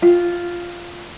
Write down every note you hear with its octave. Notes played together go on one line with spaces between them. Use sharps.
F4